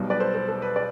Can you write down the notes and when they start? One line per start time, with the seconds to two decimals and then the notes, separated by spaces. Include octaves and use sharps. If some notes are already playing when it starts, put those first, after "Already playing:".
Already playing: B1 B2 G3
0.10 B4 D5
0.20 A4 C5
0.34 A4 C5
0.48 A4
0.62 B4
0.76 D5